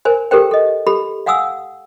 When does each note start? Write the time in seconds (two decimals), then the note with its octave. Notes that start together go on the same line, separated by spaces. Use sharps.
0.05 A#4 C5 G#5
0.31 G4 A4 A#4 C5 G5
0.51 A4 D#5
0.87 G4 A4 B5
1.26 F5 F#5 G#5 D#6 E6